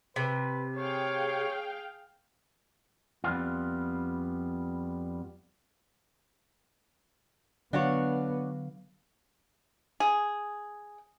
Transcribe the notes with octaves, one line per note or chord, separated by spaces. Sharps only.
C3 B4
G#4 C#5 F5 G5
F2 G3 B3 F4
D3 F#3 B3 D4 F#4 C#5 F5
G#4